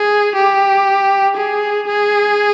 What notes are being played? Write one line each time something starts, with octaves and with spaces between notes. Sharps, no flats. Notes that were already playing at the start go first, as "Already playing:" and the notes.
Already playing: G#4
G4
G#4
G#4